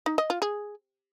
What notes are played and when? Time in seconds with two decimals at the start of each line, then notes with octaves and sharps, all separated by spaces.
0.06 D#4
0.18 D#5
0.30 F4
0.42 G#4